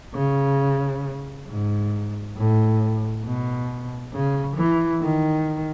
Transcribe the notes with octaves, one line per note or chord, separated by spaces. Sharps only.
C#3
G#2
A2
B2
C#3
E3
D#3